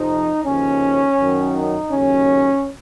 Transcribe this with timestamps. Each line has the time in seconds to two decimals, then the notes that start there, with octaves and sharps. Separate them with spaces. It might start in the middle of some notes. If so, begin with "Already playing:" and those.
Already playing: F2 C3 F3 D#4
0.45 D#2 C#3 F3 C#4
1.18 F#2 D#3 F#3
1.55 D#4
1.91 D#2 C#3 F#3 C#4